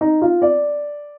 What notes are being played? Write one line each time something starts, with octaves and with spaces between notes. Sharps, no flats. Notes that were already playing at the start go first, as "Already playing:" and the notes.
D#4
F4
D5